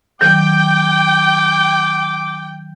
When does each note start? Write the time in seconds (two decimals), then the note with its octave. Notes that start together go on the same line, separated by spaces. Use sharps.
0.21 D#3 F#3 G5 D6